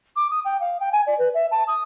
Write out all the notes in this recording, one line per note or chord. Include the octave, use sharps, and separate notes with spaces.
D6
D#6
G5
F5
G5
G#5
D5
B4
E5
A5
D#6